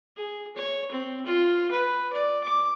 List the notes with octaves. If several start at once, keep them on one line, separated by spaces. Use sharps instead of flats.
G#4
C#5
C4
F4
B4
D5
D6